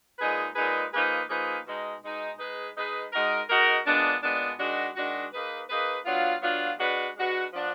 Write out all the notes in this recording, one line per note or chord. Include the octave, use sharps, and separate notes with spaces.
A#2 G#3 D#4 G#4 B4
A#2 G#3 D#4 G#4 B4
F3 A#3 D#4 G#4 B4
F3 A#3 D#4 G#4 B4
B2 G#3 D#4
B2 G#3 D#4
G#3 D#4 G#4 B4
G#3 D#4 G#4 B4
G#3 D#4 F#4 A#4
G#3 D#4 F#4 A#4
A#2 G#3 B3 D4
A#2 G#3 B3 D4
D#3 G#3 D4 F#4
D#3 G#3 D4 F#4
A#3 D#4 G#4 B4
A#3 D#4 G#4 B4
F#3 B3 D4 F4
F#3 B3 D4 F4
G#3 D4 F#4 B4
G#3 D4 F#4 B4
F3 B3 D4